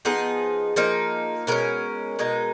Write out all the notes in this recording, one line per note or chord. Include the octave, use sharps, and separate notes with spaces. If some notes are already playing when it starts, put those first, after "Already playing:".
F3 B3 D#4 G#4
F3 A#3 D#4
B2 G#3 C#4 A#4
B2 G#3 D#4